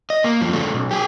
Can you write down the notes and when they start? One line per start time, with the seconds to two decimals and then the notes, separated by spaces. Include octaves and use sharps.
0.10 D#5
0.24 A#3
0.41 F#2 F3
0.53 C#3 A3
0.74 B1
0.91 G4 G#4